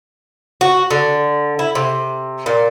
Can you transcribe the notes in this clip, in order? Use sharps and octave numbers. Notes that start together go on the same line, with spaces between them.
F#4
D3
E4
C3
A#2